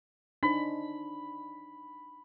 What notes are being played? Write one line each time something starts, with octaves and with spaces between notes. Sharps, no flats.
D4 D#4 C5 B5